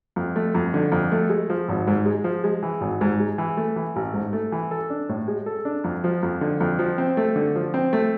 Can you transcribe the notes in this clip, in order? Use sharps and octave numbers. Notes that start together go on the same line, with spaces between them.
F2
A3
F2
D3
F2
A3
G#3
F3
G#1
G#2
G#3
F3
G#3
E3
G#1
G#2
G#3
E3
A3
E3
A1
G#2
A3
E3
A4
D4
A2
G#3
A4
D4
F2
F3
F2
D3
F2
F3
C4
A3
D3
F3
C4
A3